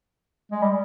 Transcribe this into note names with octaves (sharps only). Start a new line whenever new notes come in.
G#3
G3